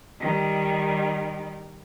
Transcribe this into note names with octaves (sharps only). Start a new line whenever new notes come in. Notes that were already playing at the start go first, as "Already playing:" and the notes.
D#3 G3